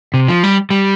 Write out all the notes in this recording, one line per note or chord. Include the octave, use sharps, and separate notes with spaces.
C3
F3
G3
G3